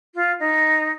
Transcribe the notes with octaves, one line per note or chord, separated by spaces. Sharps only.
F4
D#4